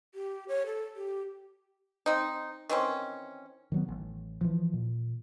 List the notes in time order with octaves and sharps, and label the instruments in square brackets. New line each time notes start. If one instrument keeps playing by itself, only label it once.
[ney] G4
C#5
A4
G4
[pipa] C4 D#4
D#3 E3 C4 C#4
[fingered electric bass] D#3 F#3 B3
A1
E3 F3
A#2